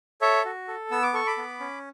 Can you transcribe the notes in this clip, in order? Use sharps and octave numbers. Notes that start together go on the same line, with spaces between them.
A4 C#5 E5
F#4
A4
B3 E6
D6
A4 C#6
B5 D6
B3
C#4